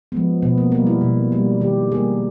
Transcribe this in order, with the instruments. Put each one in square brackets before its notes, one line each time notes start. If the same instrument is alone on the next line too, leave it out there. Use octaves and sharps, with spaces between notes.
[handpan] F3 G#3 B3
B2 B3
A#3
G3 A#3 B3
E4
B2
G3 A#3
D#3 G4
G3 A#3 G#4